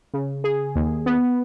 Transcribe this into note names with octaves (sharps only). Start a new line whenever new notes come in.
C#3
G#4
D#2
B3